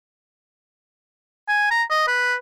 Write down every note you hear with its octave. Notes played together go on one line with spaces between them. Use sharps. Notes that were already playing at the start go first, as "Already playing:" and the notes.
G#5
A#5
D#5
B4